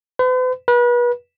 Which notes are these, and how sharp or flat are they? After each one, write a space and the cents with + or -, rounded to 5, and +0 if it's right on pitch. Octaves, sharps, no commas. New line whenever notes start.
B4 +45
B4 -35